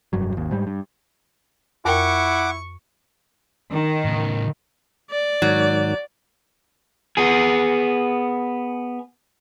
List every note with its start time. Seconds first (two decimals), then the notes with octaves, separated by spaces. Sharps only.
0.13 F1 G2 F#3
0.34 G#1 D#2
0.51 G#2 G3
0.67 G2
1.85 F2 E4 A#4 F#5 G5 C#6 D6
3.73 D#3
4.05 A2 C#3
5.11 D5
5.42 G#2 D#3 F#3
7.17 B3 G#4